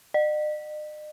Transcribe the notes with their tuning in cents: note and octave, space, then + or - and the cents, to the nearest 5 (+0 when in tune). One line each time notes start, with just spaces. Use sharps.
D#5 -45